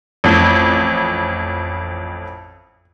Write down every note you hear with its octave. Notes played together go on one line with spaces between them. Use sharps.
A1 F2